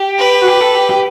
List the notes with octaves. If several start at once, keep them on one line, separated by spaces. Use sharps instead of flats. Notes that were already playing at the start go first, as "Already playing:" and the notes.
Already playing: G4
B4
F#4
G4
A4
G4
G4